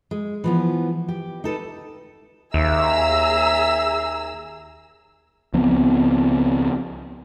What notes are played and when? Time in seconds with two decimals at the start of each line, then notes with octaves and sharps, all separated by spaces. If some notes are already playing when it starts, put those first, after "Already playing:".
0.11 G#3
0.44 E3 F3 B3
1.08 G4
1.44 D#4 A4 B4
2.54 D#2 G#4 E5 A#5 E6
5.54 C#2 F3 B3 C4